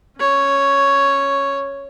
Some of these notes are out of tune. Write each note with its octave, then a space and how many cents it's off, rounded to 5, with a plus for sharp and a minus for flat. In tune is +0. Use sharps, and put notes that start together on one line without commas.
C#4 -10 C#5 +0